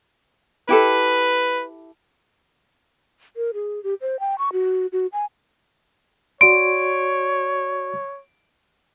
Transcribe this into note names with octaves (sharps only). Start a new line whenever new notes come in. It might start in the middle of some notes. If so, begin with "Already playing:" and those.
E4 G4 A4 B4
A#4
G#4
G4
C5
G5
C#6
F#4
F#4
G#5
F#4 C#5 D5 C6 D7